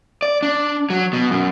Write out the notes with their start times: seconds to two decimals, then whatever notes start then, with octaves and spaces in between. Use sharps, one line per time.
0.22 D5
0.42 D4
0.90 F#3
1.13 B2
1.31 F#2